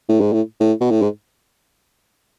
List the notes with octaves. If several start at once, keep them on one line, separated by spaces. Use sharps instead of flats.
A2
G#2
A2
A2
B2
A2
G#2